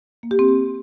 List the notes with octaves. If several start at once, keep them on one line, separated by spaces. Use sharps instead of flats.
A#3
G4
C4